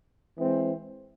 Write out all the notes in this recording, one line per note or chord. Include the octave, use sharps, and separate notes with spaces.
E3 G#3 C4